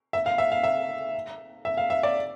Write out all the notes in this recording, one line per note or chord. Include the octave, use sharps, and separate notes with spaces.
E5
F5
E5
F5
E5
E5
F5
E5
D5